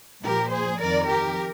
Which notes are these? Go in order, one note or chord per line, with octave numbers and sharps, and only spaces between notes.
A#2 F3 G4 A#4
G#4 C5
F2 D#3 A#4 D5
G4 A#4